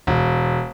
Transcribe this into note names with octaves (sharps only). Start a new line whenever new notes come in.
E1